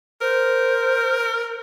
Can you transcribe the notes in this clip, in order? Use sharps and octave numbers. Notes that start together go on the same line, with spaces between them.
A#4 C5